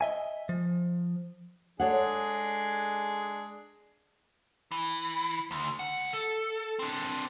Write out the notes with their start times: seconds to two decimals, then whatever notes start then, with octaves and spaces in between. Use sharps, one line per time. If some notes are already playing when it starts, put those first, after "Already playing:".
0.01 D#5 E5 G#5
0.49 F3
1.80 G#3 D4 G#4 A4 C#5 F#5
4.72 E3
5.51 D2
5.79 C#2 F#5
6.13 A4
6.79 C4 D4